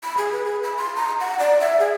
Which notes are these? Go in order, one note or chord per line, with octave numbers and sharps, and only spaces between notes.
B5
G#4
B4
G#4
B5
C6
A#5
F#5
D5
E5
G#4